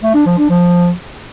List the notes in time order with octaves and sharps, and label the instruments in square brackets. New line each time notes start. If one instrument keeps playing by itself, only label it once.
[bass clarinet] A3
D4
F3
D4
F3